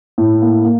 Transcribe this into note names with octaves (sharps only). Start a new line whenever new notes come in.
A2
A#3
A#3